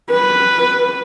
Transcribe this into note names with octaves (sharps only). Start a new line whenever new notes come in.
B4